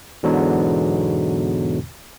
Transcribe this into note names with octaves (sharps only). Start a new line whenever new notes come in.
E2 G#2 B2 D3 F#3